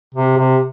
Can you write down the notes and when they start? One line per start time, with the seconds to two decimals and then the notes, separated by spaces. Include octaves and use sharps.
0.15 C3
0.38 C3